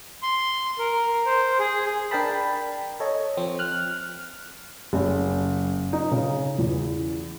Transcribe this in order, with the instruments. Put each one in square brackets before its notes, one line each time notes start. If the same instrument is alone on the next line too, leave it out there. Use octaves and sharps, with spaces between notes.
[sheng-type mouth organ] C6
A#4
C5
G#4
[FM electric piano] D4 A#4 G5 A5 B5
A4 C#5 D#5
F3 C4
F6 F#6
[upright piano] F#1
D#4
C#3
E2